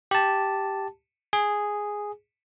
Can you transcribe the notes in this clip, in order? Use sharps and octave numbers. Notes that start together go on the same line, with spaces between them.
G4 A5
G#4